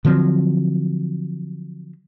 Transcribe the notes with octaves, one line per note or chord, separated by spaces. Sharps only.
D3 F3 F#3 C4